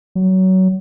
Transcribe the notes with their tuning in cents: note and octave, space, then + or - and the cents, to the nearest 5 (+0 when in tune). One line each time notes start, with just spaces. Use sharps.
F#3 +20